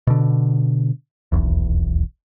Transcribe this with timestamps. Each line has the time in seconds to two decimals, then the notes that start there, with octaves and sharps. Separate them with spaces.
0.07 B2 D3
1.32 D#1 B1 E2